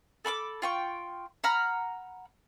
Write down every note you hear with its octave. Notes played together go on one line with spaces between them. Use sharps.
A4 B5 C#6 D6
F4 G5 C#6
F#5 A#5 B5 F6